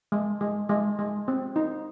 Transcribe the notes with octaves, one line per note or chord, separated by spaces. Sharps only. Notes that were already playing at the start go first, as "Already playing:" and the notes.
G#3
G#3
G#3
G#3
C4
D#4